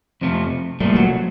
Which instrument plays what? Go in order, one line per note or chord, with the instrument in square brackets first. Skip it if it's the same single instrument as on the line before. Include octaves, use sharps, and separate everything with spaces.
[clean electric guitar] F2 C3 F3 A3
[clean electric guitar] C2 A#2 F3 A3 [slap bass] G3
[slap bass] F#3